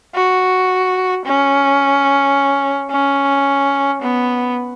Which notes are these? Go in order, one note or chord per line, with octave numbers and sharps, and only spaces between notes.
F#4
C#4
C#4
B3